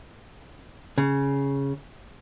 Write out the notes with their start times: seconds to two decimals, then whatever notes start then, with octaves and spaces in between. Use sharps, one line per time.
0.98 C#3